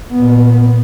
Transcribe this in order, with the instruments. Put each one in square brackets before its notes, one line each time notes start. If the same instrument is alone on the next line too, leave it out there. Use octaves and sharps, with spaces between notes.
[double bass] A#2 B3